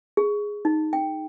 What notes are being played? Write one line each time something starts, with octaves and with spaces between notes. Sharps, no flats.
G#4
D#4
G5